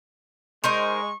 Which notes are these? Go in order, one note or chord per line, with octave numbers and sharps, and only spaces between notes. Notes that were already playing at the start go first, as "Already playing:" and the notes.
G#3 D#4 A#4 C5 C#6